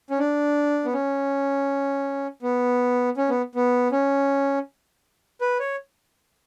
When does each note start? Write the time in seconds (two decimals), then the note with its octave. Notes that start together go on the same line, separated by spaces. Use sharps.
0.10 C#4
0.19 D4
0.85 B3
0.93 C#4
2.42 B3
3.17 C#4
3.29 B3
3.55 B3
3.92 C#4
5.41 B4
5.59 C#5